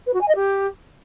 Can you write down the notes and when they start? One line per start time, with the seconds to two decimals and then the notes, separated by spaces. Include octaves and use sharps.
0.06 B4
0.13 F#4
0.21 G#5
0.28 D#5
0.35 G4